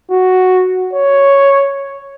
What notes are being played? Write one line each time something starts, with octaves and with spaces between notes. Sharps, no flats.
F#4
C#5